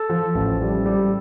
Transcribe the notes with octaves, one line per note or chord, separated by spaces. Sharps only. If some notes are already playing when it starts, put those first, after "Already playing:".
Already playing: A4
F3
A1
G3
G3